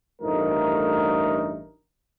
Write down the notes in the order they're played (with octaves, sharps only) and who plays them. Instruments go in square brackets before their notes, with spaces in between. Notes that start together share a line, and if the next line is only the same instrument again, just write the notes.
[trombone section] A1 G2 F3 A3 D#4 A#4